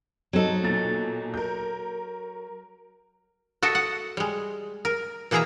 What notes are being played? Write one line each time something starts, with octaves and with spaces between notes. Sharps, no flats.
F#3 C4 D#4 A4
B1 A#2 A6
A#4 G6
F#4 A4 D#5 E5
F#5
G3 G#3
A#4
B2 E3 A#3 G#4 E5 A#5